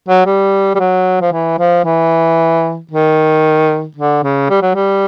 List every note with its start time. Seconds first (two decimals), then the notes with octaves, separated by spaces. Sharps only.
0.08 F#3
0.26 G3
0.75 G3
0.79 F#3
1.21 F3
1.33 E3
1.59 F3
1.85 E3
2.91 D#3
3.97 D3
4.24 C#3
4.50 G3
4.62 F#3
4.75 G3